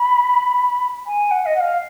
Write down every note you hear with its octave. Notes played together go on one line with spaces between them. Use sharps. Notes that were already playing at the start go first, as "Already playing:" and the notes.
Already playing: B5
G#5
F#5
D#5
F#5
F5